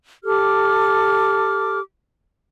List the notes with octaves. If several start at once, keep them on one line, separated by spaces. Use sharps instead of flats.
G4 A4 D6 F6